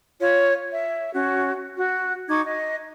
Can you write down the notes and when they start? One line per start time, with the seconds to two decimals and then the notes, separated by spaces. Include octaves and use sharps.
0.19 F4 C#5
0.70 E5
1.13 C#4 F#4
1.75 F#4
2.29 D#4 C#6 D6 G#6
2.42 D#5